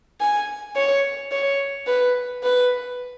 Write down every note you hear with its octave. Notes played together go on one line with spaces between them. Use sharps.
G#5
C#5
C#5
B4
B4